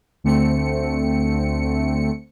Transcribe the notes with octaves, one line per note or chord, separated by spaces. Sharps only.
D2 D3 A3 C4 C#7